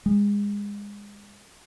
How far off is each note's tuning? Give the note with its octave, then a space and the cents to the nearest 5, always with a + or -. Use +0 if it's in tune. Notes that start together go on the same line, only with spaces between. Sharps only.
G#3 -25